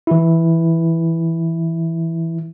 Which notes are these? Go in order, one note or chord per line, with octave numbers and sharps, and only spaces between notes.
E3 E4